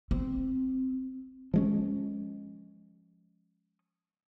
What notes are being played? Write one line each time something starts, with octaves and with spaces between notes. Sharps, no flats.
C4
F3 G#3 C#4